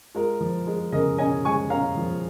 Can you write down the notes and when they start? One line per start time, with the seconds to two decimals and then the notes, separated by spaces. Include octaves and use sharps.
0.15 G#3 F4 A#4
0.41 F3
0.67 G#3
0.92 C#3 A#4 D#5
1.18 C#4 D#5 G#5
1.45 G#3 G#5 C#6
1.70 C#4 F5 A#5
1.97 F3